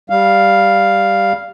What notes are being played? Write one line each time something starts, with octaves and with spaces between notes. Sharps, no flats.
G3 F5